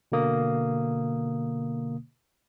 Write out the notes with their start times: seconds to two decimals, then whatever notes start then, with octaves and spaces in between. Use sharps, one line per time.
0.12 B2 D3 A#3 D#6